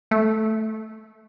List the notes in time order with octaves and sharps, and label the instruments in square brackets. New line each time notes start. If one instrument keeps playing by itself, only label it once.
[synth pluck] A3